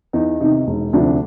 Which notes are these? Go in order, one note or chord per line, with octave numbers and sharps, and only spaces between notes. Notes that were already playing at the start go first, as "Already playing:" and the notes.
E2 D#4
C3 D#3 D#4
E1
D2 C3 F3 D4